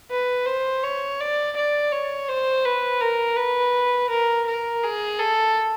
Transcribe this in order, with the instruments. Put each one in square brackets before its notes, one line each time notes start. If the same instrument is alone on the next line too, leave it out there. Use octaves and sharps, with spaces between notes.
[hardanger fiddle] B4
C5
C#5
D5
D5
C#5
C5
B4
A#4
B4
A#4
A#4
G#4
A4